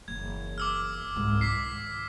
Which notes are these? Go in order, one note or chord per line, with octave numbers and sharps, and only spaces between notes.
F#1 E3 G#6
D6 E6 F6
C2 G#2
D#3 D6 B6 C7